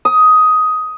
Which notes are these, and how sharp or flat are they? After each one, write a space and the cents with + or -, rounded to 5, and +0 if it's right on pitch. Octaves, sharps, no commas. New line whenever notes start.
D#6 +10